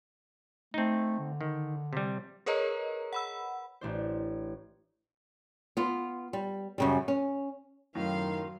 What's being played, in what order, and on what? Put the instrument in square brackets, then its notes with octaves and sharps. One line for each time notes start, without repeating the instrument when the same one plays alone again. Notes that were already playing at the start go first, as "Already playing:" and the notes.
[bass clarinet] A3 [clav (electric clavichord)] C4 D#4
[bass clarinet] D3
[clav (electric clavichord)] D#3
C3 G3
[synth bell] G#4 A#4 B4 C#5 D#5 A#5
F#5 B5 E6
[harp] A1 D4 C5
[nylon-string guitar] B3 F4
G3
F#2 C#3 G3
C#4
[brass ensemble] F#2 D#3 [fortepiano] A2 [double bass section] F#3 [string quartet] F5 C6